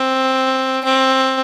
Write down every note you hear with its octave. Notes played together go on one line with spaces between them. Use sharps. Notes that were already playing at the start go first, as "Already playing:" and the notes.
Already playing: C4
C4